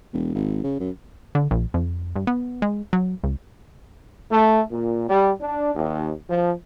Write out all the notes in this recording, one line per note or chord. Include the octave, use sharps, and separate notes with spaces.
E1
G#1
C#3
F#2
D3
A#1
F2
G2
B3
G#3
F#3
C#2
A3
A#2
G3
D4
D#2
F3